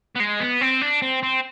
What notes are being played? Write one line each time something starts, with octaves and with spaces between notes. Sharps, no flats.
B3
G#3
B3
C4
D4
C4
C4